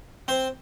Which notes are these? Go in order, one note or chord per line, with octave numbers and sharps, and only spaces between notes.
C4 C5